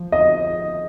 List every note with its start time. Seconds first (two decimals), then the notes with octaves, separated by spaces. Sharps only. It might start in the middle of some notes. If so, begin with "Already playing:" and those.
Already playing: F3
0.12 D#5